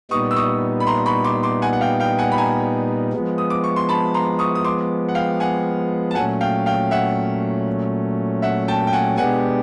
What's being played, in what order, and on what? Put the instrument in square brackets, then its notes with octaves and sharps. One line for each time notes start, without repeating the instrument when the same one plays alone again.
[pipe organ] A#2 G3 B3 D#4 [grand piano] C#6 D#6
[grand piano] E6
C#6 D#6
B5
A#5 C6
B5 C#6
C6 D6
C6 D6
F#5 G#5
F#5
F5 G5
F5 G5
F#5 G#5
B5
G#5 A#5
[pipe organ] F3 G#3 B3
[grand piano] D#6
D6
C#6
C6
A5 B5
A#5 C6
C#6 D#6
D#6
C6 D6
F#5
F5 G5
F#5 G#5
A5
[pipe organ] A#2 F#3 A3 C#4 [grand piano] F#5 G#5
[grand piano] F5 G5
F5 G5
E5 F#5
E5 F#5
G5 A5
G5
F#5 G#5
[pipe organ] B2 G#3 B3 D4 G4 [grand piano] F#5 G#5